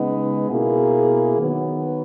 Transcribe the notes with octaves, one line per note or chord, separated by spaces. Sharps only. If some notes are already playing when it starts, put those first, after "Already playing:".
Already playing: C#3 G#3 B3 D#4
B2 A#3 E4 G#4
D#3 F#3 B3